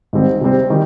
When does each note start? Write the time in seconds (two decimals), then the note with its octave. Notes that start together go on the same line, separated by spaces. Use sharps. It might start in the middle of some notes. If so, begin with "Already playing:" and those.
0.13 G#2 D#3 G3 C4
0.41 C3 G3 C4
0.70 D#3 G3